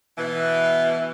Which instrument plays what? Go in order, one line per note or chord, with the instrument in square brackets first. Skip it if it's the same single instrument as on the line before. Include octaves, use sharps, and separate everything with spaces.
[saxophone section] B2 E3